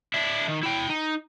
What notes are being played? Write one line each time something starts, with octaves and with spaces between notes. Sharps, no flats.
D4 E4
D#3
E4 G5
D#4